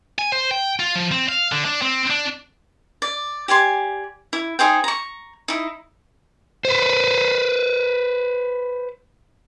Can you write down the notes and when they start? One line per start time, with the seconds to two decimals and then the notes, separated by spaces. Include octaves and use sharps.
0.19 G#5
0.32 C5
0.51 G5
0.80 F4
0.95 F3
1.12 C4
1.29 F5
1.52 D3
1.65 D4
1.82 C4
2.10 D4
3.02 D5
3.48 G4 D5 G#5 C6
4.33 E4
4.59 D#4 G#4 C5 G5
4.84 A#5 C#6
5.48 D#4 E4
6.65 B4 C5